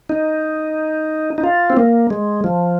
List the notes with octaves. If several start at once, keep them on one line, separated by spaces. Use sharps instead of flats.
D#4
D#4
F4
C4
A#3
G#3
F3